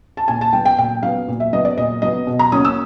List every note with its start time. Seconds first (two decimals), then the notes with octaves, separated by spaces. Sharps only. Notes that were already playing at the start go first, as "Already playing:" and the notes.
0.17 A5
0.28 A#2 G#5
0.41 A5
0.53 F#3 B3 G5
0.65 G5
0.78 A#2 G5
1.03 F#3 B3 F5
1.28 A#2
1.40 E5
1.53 F#3 B3 D#5
1.65 D5
1.78 A#2 D#5
2.02 F#3 B3 D#5
2.27 B2
2.39 A#5
2.52 F#3 A#3 C#4 D#6
2.65 E6